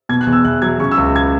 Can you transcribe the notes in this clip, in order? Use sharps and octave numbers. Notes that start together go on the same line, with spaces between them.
B2 G#6
F#6
E2
E6
E2 F#6
F#3 G#6
C#3 C#6
E6
C#2
G#6